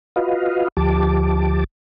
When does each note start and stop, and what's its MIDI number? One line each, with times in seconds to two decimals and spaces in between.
0.16 0.68 65
0.16 0.68 66
0.16 0.68 71
0.16 0.68 75
0.16 0.68 77
0.77 1.64 38
0.77 1.64 53
0.77 1.64 67
0.77 1.64 81
0.77 1.64 86